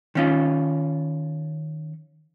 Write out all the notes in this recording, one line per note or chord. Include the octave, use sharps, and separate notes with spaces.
D#3 C#4 F4